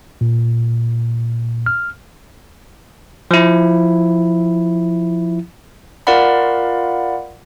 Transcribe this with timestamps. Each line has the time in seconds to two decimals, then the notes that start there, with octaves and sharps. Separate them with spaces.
0.21 A#2
1.66 F6
3.31 F3 E4
6.07 F4 A#4 D5 F5 F#5 B5